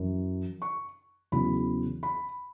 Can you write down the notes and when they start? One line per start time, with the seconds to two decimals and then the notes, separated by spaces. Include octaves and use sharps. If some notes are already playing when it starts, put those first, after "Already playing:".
Already playing: F#2 E3
0.62 C#6
1.32 E2 C#3 F#3 B5
2.03 B5